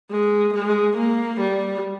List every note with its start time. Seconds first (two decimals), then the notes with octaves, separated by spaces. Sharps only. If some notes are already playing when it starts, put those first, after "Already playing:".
0.11 G#3
0.54 G#3
0.97 A#3
1.40 G3